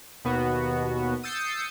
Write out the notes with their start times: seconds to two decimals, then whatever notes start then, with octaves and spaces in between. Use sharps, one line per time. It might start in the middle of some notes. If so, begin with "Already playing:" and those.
0.24 D#2 B2 B3 F#4
1.23 D#6 E6 G6 A6 C7 C#7